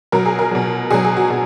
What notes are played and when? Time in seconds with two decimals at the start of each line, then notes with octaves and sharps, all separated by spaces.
0.12 B2 F#3 A#4
0.26 G#4
0.39 A#4
0.51 B2 F#3
0.91 B2 F#3 G#4
1.05 G#4
1.17 F#4
1.30 B2